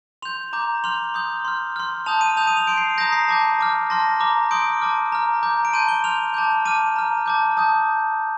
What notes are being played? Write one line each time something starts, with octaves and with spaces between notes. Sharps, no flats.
C6 G6 F7
A#5 D6 G6
C6 F6 F7
C6 D#6 G6
C6 F6
C6 F6
A5 D#6 G6 F7
D#7
A5 D#6 G6 F7
D#7
F7
C6 G6 D7
C7
A#5 D#6 G6 A#6
C7
A5 D6 G6
A5 D6 F6
A5 C6 F6 A#6
A#5 D6 F6
C6 D#6 G6 D7
A5 D6 F6
A#5 F6
A#5 D6 G6
D7
A5 C6 G6 D#7
G7
C6 F6 F7
A5 D6 G6
A5 D6 F6 D#7
A#5 F6
A5 D6 G6
A5 D#6 G6